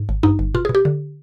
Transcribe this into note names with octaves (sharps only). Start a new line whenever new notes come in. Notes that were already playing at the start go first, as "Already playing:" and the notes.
Already playing: G#2
G#1
G2 D#4
G1
B2 F4
G#4
B2
G4
D3